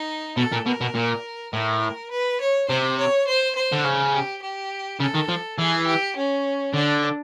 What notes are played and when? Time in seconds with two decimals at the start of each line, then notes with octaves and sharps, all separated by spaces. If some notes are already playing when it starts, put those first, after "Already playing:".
Already playing: D#4
0.37 B2 A4
0.52 A#2
0.66 B2 A#4
0.81 B2
0.95 A#2
1.53 A2 A#4
2.11 B4
2.41 C#5
2.69 C3 C5
2.98 C#5
3.27 C5
3.55 C5
3.72 D3
3.84 C#3
4.14 G4
4.42 G4
5.00 C#3 A4
5.14 D#3
5.28 F3
5.58 E3 G#4
5.87 G4
6.16 C#4
6.73 D3 D4